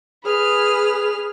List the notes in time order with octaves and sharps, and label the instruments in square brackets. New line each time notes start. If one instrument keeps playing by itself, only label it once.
[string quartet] G#4 B4 F6